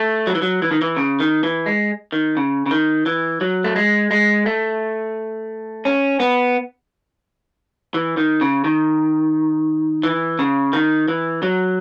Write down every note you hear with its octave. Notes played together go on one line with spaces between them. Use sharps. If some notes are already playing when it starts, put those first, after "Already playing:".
Already playing: A3
F#3
E3
F#3
E3
D#3
E3
C#3
D#3
E3
G#3
D#3
C#3
C#3
D#3
E3
F#3
A3
G#3
G#3
A3
C#4
B3
E3
D#3
C#3
D#3
E3
C#3
D#3
E3
F#3